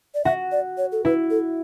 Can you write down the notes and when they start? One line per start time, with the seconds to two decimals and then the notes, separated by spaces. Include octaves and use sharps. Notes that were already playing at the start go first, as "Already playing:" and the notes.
0.15 D5
0.25 F#4 E5
0.52 D5
0.78 C#5
0.92 A4
1.05 E4 B4
1.30 A4